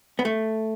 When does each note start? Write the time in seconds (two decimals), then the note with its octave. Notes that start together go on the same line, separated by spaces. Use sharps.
0.19 B3
0.25 A3